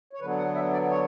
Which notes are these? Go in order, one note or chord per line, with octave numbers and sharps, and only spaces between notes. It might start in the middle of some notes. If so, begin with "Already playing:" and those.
C#5
D3 F#3 B3 B4
F#5
E5
D5
C#5